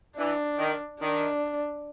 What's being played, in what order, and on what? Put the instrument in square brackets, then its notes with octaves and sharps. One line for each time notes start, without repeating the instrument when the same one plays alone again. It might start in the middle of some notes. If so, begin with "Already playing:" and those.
[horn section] E3 [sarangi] D4
[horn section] D#3
[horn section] D#3 [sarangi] D4